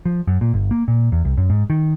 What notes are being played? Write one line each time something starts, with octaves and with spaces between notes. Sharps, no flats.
F3
F#2
A#2
G1
A#3
A#2
E2
C2
F#2
G#2
D#3